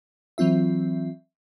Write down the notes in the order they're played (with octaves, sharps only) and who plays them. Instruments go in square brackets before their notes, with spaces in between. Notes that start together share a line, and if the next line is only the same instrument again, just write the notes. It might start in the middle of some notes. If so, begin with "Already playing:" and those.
[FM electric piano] E3 F#3 C4 F4 E5